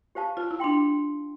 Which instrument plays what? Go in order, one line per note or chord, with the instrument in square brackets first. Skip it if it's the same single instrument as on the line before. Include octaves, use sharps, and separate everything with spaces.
[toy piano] G4 C5 F5 A5
[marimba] F4 [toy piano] C5
[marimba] E4
[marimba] D4 [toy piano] G5 C6